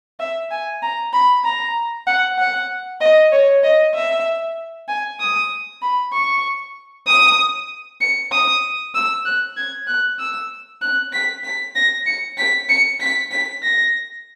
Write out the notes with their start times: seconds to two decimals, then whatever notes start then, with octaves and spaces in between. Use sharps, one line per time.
0.20 E5
0.51 G#5
0.82 A#5
1.13 B5
1.45 A#5
2.07 F#5
2.39 F#5
3.01 D#5
3.32 C#5
3.63 D#5
3.95 E5
4.88 G#5
5.20 D#6
5.82 B5
6.13 C#6
7.07 D#6
8.01 C#7
8.32 D#6
8.95 E6
9.25 F#6
9.57 G#6
9.87 F#6
10.19 E6
10.82 F#6
11.13 B6
11.44 B6
11.75 A#6
12.06 C#7
12.38 B6
12.69 C#7
13.00 B6
13.31 B6
13.63 A#6